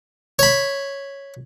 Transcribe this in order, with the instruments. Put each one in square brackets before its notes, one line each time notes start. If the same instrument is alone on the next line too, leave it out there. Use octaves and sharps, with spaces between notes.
[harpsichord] C#5 B5